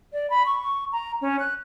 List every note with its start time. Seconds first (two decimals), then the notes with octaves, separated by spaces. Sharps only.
0.12 D5
0.29 B5
0.46 C#6
0.92 A#5
1.21 C#4
1.39 F#6